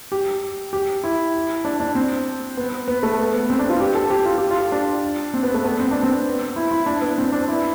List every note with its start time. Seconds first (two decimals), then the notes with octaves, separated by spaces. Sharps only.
0.12 G4
0.73 G4
1.04 E4
1.65 D4
1.80 D4
1.95 C4
2.57 B3
2.88 B3
3.03 A3
3.19 B3
3.34 B3
3.50 C4
3.59 D4
3.70 F4
3.80 G4
3.95 A4
4.10 G4
4.26 F4
4.38 G4
4.51 F4
4.72 D4
5.34 C4
5.43 B3
5.54 A3
5.64 B3
5.79 C4
5.91 D4
6.03 C4
6.56 E4
6.71 E4
6.86 D4
7.02 B3
7.18 C4
7.32 D4
7.48 E4